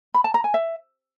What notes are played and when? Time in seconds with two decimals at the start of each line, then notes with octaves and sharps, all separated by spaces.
0.14 B5
0.24 A5
0.34 A#5
0.44 G#5
0.54 E5